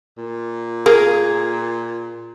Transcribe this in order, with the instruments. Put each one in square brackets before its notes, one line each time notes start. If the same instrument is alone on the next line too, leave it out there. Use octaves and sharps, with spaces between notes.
[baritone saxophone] A#2
[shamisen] A#3 [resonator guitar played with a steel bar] G#4